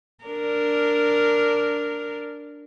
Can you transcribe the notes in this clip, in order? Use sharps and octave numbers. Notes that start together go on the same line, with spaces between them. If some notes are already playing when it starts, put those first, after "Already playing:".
D4 A#4